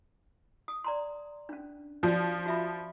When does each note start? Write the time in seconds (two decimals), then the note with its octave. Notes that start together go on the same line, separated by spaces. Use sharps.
0.68 D#6
0.84 D5 A#5 C6
1.49 C#4 D4
2.03 F3 C#4 F#4 D5
2.46 F#4 E5 B5